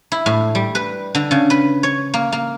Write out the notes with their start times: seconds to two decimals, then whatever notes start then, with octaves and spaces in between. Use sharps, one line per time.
0.12 E4
0.26 A2
0.55 G3
0.75 B4
1.15 D3
1.31 C#3
1.50 B4
1.83 C#5
2.14 A#3
2.32 A#3